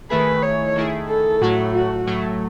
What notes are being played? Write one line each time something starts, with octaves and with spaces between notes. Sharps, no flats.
D#3 A3 E4 G#4 B4
C#5
D#3 A3 E4 G#4
A4
A2 F#3 A3 F#4
F#4
A2 F#3 A3